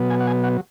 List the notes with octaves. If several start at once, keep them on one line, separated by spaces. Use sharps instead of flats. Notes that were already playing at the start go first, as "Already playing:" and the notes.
Already playing: B2 F#3 B3
G#5
F#5
G#5
F#5